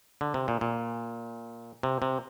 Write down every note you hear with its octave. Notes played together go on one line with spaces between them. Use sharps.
D3
C3
A#2
A#2
C3
C3